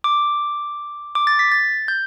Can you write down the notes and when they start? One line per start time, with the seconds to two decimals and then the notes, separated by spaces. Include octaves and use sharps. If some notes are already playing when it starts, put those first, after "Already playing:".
0.04 D6
1.15 D6
1.27 A6
1.39 B6
1.52 A6
1.88 G6